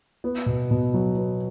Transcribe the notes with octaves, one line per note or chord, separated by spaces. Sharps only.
B3
B2
B2
F#3
B3